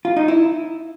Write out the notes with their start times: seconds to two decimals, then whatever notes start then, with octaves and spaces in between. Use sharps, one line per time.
0.05 F4
0.17 D#4
0.28 E4